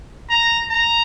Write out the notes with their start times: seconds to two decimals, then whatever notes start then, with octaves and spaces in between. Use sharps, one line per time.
0.30 A#5
0.71 A#5